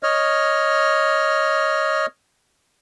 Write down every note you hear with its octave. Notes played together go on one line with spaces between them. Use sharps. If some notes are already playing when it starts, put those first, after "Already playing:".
C#5 D#5 F6